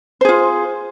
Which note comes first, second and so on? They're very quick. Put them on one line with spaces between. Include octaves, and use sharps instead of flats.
C5 G#4 F4